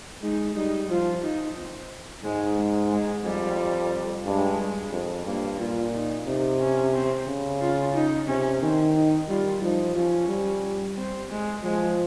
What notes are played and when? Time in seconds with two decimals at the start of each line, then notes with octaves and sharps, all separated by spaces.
0.22 G#3 D#4
0.55 G3 D#4
0.89 F3 F4
1.23 D#4
1.57 C4
2.23 G#2 G#3
2.58 G#3
2.91 G#3
3.24 F2 G3
4.25 G2 G#3
4.92 F2
5.26 G2 A#3
5.59 A#2 F4
5.93 D#4
6.27 C3 D#4
6.60 C#4
6.94 C4
7.27 C#3
7.61 F4
7.94 D#4
8.28 C3 C#4
8.62 D#3 C4
8.95 D#4
9.28 G3 F4
9.62 F3 D#4
9.95 F3 C#4
10.29 G3
10.97 C4
11.30 G#3
11.64 F3 G#3